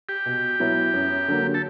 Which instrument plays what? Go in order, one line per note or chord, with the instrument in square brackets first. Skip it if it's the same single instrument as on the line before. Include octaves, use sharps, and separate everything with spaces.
[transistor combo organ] G4
[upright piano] B2
F#3 B3 E4
F#2
D3 F#3 A#3
[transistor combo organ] A4